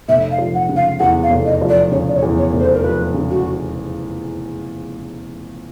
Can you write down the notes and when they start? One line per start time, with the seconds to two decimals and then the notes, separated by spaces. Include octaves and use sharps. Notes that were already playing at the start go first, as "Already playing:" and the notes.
0.08 F1 E5
0.31 F5
0.38 F3
0.54 F#5
0.69 C#3
0.76 F5
0.99 E2 F#5
1.23 F5
1.30 F1
1.45 D#5
1.61 F3
1.69 D5
1.92 C#3 C#5
2.08 D5
2.14 C#5
2.22 E2
2.37 C#5
2.53 F1
2.60 C5
2.73 A#4
2.83 F3 B4
3.14 C#3
3.30 F#4